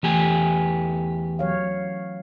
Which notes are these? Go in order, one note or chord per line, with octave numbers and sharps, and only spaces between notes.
E2 E3 A3 G4 G#5
F#3 C#5 F5